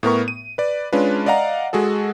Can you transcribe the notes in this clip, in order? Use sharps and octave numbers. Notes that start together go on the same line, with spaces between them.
A2 B3 A#4 C#6
D#7
B4 D5
G#3 C#4 D4 F4 B4
D5 D#5 F5 F#5 A#5
G#3 F#4 G#4 A4